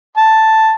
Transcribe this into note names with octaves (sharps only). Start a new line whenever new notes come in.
A5